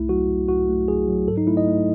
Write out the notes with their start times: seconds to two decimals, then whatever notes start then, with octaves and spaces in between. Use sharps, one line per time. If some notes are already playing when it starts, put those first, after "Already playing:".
Already playing: C2 A3 E4
0.09 F#3 F#4
0.29 C2
0.49 C2 F#4
0.69 A3
0.88 F#3 G#4
1.08 F#3
1.28 G#2 A4
1.37 D#4
1.47 A3 E4
1.57 D#5
1.67 A3